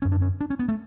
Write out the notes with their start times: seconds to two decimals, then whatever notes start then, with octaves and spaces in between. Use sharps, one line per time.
0.02 D3 C#4
0.05 F#2
0.12 D4
0.22 C#4
0.41 D4
0.50 C#4
0.59 B3
0.69 A3